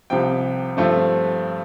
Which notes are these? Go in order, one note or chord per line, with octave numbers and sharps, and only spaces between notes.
C2 C3 F3 G5
G2 F3 A3 C4